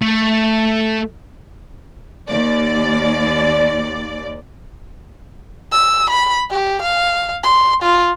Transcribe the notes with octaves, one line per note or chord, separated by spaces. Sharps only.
A3
D#2 D5
E6
B5
G4
F5
C6
F4